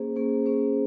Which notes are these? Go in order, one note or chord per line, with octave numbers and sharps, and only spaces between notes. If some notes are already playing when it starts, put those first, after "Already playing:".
Already playing: A#3 C#4 G#4 C5
A#3 C#4 G#4 C5
A#3 C#4 G#4 C5